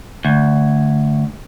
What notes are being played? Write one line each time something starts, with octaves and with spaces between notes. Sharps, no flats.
D2